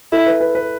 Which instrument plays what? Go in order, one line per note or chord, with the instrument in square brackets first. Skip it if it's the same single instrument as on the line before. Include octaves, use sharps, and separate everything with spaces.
[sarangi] E4 [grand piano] A4
[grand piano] B4
B4
B4